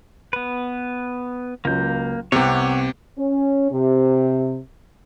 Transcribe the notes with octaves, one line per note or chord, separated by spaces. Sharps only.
B3 B4
C#2 F#3 A#3 G6
C2 C3 B3 G4 C#5 F#5
C#4
C3